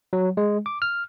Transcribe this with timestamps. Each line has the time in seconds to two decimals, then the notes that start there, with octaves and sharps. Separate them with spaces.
0.13 F#3
0.37 G#3
0.66 D6
0.82 F6